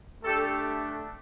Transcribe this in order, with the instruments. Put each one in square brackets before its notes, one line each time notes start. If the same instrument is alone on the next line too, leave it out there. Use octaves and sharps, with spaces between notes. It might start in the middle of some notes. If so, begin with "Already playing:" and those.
[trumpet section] A3 D4 G4 A4